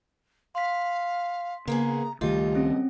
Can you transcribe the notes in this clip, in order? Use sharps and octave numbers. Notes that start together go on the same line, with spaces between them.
F5 C6 B6
C#3 A#3 B3 G#4 A#5
C#2 D#3 G3 A3 F4 G4 D#5
C4 C#4